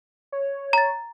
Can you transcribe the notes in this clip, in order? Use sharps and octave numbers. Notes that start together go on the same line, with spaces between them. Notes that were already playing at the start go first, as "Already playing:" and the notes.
C#5
A#5 A6